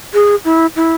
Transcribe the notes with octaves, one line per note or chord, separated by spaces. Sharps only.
G#4
E4
E4